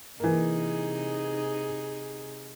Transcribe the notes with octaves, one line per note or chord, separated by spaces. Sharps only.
C3 E3 A#3 D#4 G#4